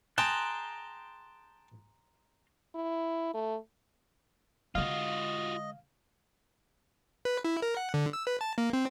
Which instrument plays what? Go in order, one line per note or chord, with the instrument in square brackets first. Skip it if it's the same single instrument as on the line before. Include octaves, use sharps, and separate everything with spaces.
[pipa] G#4 [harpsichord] G5 A5 [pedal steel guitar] A#5 C6 F#6
[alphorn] E4
A3
[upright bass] D3 G#3 [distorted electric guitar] F4 F#4 [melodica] D#5 [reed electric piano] F5
[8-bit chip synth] B4
E4
A#4
F#5
D3
E6
B4
A5
A#3
C4